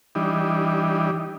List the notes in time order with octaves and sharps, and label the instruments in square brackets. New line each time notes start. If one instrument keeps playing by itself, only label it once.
[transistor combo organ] E3 G3 D4 D#4